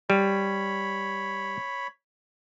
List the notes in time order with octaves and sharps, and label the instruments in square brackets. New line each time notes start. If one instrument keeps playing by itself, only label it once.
[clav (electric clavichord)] G3 [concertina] C#5 B5